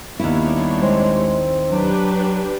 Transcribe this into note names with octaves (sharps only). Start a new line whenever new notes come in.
D#2 G3 B3 D4 E4 C#5
G#3 C4
F#3 D4 G4 B4